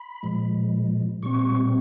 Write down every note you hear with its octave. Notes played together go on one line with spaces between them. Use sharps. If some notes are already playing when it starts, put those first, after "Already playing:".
Already playing: B5
A#2 F3 G#3
A#2 G3 C4 C#6